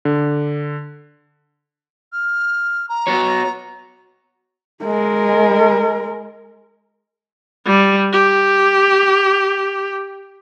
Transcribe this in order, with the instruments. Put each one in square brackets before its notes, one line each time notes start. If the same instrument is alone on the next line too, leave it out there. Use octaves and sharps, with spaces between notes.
[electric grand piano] D3
[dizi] F6
A#5
[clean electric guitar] B3 F#4 C#5
[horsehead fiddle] G#3 A#4
[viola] G3
G4